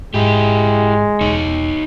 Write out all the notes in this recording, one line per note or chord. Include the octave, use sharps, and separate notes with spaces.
G#2 G#3 E4 G4
E1 D#4 C#5